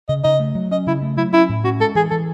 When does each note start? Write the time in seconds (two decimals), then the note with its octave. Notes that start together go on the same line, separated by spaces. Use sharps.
0.09 C#3 D#5
0.24 C#3 D#5
0.40 A3
0.55 F#3
0.71 C#4 D#5
0.87 C#3 E4
1.02 A3
1.17 F#3 E4
1.33 C#4 E4
1.49 A2
1.64 C#4 F#4
1.79 G#3 A4
1.95 E3 G#4
2.11 E3 A4